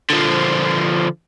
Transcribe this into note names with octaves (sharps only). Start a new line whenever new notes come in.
D3 F3